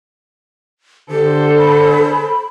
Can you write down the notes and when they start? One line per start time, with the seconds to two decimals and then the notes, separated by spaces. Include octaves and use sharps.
1.11 D3 G4 A4 C5
1.58 B5